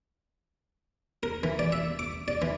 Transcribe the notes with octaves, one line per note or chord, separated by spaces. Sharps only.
A#4
E3
D5
E5
D6
D5
E3